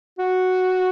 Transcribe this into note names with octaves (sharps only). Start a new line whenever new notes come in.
F#4